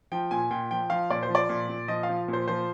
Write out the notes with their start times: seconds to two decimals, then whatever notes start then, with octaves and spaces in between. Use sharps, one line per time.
0.12 F3 G5
0.31 A#2 G#5
0.51 A#2 G5
0.71 F3 G5
0.90 F3 F5
1.10 A#2 D5
1.23 C5
1.29 F3
1.35 D5
1.49 A#2
1.69 A#2
1.88 F3 D#5
2.03 F5
2.09 F3
2.28 A#2
2.33 C5
2.48 F3 C5